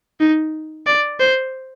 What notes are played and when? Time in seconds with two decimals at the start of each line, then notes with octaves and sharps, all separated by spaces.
0.20 D#4
0.87 D5
1.20 C5